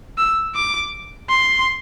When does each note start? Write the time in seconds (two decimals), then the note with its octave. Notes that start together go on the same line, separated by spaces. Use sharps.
0.18 E6
0.55 D6
1.29 C6